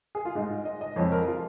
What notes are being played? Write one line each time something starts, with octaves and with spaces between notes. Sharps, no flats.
G#4
F4
G#2 G#3 D#4
D#5
D#5
F2 F3 G#3 C#5
A#4
F4